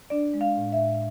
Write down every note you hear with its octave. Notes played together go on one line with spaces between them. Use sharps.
D4 D5
G#3
F5
A2
E5
A2